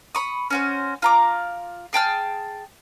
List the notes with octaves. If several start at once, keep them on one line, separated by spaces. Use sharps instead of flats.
B5 C#6 D#6
C#4 F#4 C5
F4 A#5 D6
G#4 G5 A5 F6